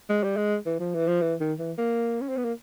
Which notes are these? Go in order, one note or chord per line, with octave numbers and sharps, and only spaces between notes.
G#3
G3
G#3
E3
F3
E3
F3
E3
D#3
E3
A#3
C#4
C4
B3
A#3